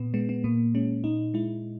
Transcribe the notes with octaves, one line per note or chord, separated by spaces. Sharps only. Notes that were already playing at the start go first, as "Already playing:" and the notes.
Already playing: A#2 B3
G#3 B3
B3
A#2 A#3
G#3 C#4
A#2 D#4
G#3 E4